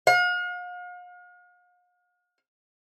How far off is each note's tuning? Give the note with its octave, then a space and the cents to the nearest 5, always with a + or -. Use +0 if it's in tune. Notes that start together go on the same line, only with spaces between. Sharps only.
F5 +45